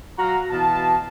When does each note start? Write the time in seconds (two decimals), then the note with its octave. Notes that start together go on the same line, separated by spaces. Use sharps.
0.19 F#3 F#4 F5 A#5
0.51 B2 E3 F5 A5